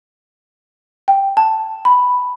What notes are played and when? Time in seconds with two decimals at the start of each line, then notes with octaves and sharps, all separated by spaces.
1.08 G5
1.37 A5
1.85 B5